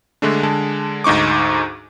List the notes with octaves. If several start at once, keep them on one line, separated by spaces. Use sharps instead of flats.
D3 G#3 A3 D4
D3 G#3 A5
D2 G#2 D#4 C#6 D6